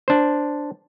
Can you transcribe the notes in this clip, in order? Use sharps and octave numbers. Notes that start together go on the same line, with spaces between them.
D4 C5